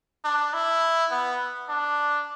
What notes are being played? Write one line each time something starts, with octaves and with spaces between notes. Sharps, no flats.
D4
E4
B3
D4